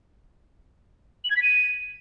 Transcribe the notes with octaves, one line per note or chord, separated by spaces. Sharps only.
F#7
G#6
B6
D#7